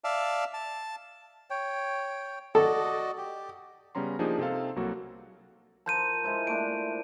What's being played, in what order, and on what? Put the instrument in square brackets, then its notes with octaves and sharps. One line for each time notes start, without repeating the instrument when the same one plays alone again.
[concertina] D5 E5 F5 A5
A5
[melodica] C#5 G5
[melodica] F#4 D5 D#5 [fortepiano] A4
[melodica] G4
[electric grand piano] C#3 G3 B3 C#4 A#5 C6
F3 A#3 D4 D#4 G4 G#4
C3 C4 D#4 A4 F5
C2 F#3 A#3 F#4 A4
[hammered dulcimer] F3 A#4 C5 [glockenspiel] A5 G6 D#7
[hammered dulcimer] G#3 E4 C5
[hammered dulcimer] A#2 A3 D4 [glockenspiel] D7